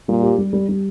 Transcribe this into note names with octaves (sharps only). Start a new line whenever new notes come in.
A#2 G3
G4
G3
G3
G3